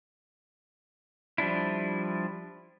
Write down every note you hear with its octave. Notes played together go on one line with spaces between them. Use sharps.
F3 G3 D4 E4